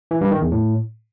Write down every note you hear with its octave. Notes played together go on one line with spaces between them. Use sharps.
E3
G2
D#3
E2
A2